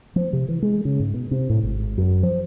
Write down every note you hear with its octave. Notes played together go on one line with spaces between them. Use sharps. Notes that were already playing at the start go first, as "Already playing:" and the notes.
F3
C3
E3
G#3
C#3
G#2
B2
C3
A2
G#1
F#2
F3